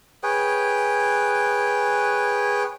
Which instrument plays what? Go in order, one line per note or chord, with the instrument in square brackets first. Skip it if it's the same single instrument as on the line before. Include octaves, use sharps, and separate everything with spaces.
[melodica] G#4 B4 C#5 G5